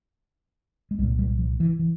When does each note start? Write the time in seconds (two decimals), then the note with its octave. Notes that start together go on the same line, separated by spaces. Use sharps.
0.91 G#3
0.98 C2 G3
1.03 A#2
1.19 G3
1.39 F3
1.60 E3
1.79 E3